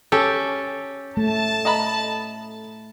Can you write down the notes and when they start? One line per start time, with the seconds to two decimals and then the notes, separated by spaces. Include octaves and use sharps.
0.12 C#4 G4 A4
1.17 A3 A5
1.65 D#5 A#5 B5